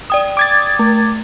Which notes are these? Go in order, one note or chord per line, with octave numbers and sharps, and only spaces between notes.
D5 G5 D#6
D6 G#6 A6
A3